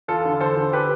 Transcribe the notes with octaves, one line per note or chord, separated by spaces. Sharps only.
E2 F4 A4
D3
E2 A4 C5
D3
G4 B4